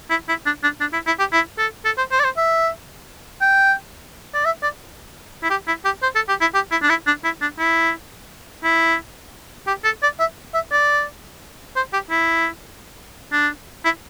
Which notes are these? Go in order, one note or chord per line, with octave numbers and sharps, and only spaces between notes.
E4
E4
D4
D4
D4
E4
E4
G4
E4
A4
A4
C5
C5
D5
C5
E5
G5
D5
E5
D5
E4
G4
E4
G4
C5
A4
G4
E4
G4
E4
D4
E4
D4
E4
D4
E4
E4
G4
A4
D5
E5
E5
D5
C5
G4
E4
D4
E4